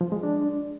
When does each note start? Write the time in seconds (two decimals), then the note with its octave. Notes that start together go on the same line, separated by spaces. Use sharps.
0.01 F3
0.12 G#3
0.23 D4